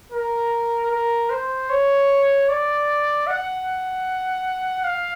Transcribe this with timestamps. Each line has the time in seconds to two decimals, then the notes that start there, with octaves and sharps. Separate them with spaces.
0.12 A#4
0.91 A#4
1.30 C5
1.70 C#5
2.49 D5
3.27 F#5
4.85 F5